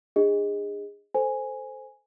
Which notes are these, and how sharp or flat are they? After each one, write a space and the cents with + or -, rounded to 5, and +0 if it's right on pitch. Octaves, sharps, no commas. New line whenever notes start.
D4 +25 G#4 -25 D#5 +0
A4 +0 C5 -5 G#5 +0